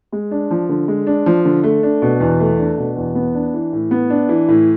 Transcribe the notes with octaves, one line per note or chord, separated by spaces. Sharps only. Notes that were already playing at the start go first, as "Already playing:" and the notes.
G#3
D4
F3
D3
G#3
D4
F3
D3
A3
D4
B2
E2
A3
D4
B2
E2
B3
D4
E3
A2
B3
D4
E3
A2